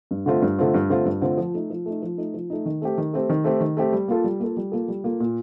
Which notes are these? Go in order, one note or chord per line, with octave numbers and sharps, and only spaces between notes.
G2
D3 A3 C4 F4
G2
D3 A3 C4 F4
G2
D3 A3 C4 F4
G2
D3 A3 C4 F4
F3
A3 D#4
F3
A3 D#4
F3
A3 D#4
F3
A3 D#4
D#3
A3 C4 G4
D#3
A3 C4 G4
D#3
A3 C4 G4
D#3
A3 C4 G4
G3
A#3 F4 A4
G3
A#3 F4 A4
G3
A#3 F4 A4
G3
A#3 F4 A4
A#2